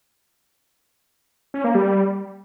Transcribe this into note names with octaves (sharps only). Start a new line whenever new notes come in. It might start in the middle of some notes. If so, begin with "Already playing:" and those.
C#4
A#3
G3